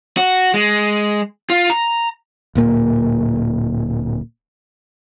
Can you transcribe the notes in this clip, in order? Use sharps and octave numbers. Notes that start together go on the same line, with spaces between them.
F#4
G#3
F4
A#5
D1 A#2 A#3